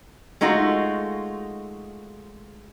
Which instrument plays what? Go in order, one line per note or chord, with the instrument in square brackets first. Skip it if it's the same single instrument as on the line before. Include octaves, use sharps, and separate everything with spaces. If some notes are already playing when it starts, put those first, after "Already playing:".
[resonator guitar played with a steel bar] G#3 A3 D#4 F4 F#4